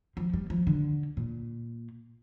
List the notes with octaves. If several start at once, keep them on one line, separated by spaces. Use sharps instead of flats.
F3
G3
F3
D3
A#2